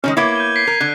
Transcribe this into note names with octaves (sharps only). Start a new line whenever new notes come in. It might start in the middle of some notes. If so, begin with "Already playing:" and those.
B2 D#3 G#3 C#4 F6
A#3 B3 E4 C#5 B5 D6 G#6
G6 D#7 G7
B6 C7 D7
A#4
D3 F#6